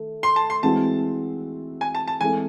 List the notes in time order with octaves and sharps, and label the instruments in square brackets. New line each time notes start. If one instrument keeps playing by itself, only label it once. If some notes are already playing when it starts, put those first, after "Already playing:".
Already playing: [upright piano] D#3 A3
[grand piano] C6
A5
C6
[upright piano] E3 G#3 C4 F#4 [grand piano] A5
[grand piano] G#5
A5
A5
[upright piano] E3 G#3 C4 E4 A4 [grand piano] G#5